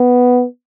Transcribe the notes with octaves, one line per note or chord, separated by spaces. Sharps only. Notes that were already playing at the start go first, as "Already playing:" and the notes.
Already playing: B3